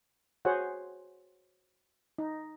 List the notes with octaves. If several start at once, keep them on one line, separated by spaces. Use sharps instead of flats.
F#4 G#4 C5 C#5 F#5
D#4